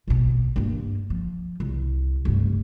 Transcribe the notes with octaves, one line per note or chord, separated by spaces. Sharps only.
A#1 B2
G2 A#3
F3
C2
F1 G2